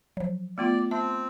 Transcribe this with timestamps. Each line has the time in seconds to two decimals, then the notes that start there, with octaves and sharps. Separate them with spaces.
0.17 F3 F#3
0.58 A3 B3 F4 D5
0.91 C4 E5 A5